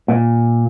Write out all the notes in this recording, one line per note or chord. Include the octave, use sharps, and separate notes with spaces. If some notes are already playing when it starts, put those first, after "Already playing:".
A#2